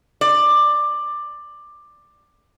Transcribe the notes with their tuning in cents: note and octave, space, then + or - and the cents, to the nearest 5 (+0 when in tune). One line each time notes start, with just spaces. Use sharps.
D5 +15